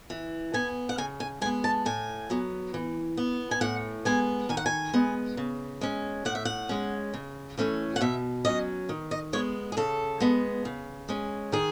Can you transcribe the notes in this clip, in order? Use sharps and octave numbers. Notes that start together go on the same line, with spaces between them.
E3
B3 G#5
F#5
C#3 G#5
G#5
G#3 B3 G#5
A5
A2 G#5
F#3 B3
E3
B3
G#5
A2 F#5
G#3 B3 G#5
D#3 G#5
F#5
G#5
G#3 B3
C#3
G#3 C#4
A2 F#5
E5
F#5
G#3 C#4
C#3
E3 A3 C#4
F#5
B2 E5
F#3 C#4 D#5
D#3
D#5
G#3 B3 C#5
G#4
C#3 A4
G#3 B3
C#3
G#3 C#4
D#3 G#4